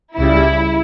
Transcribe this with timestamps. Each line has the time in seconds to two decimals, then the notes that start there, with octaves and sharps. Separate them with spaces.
0.17 C#2 C#3 G3 E4